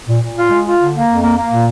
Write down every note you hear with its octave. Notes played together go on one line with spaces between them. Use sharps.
A#2
A#2
F4
G#3
F4
D3
A#3
F2
A#3
A#3
A#2